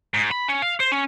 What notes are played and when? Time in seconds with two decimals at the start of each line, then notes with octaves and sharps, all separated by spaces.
0.14 G#2
0.31 B5
0.48 C#4
0.62 F5
0.80 C5
0.92 C#4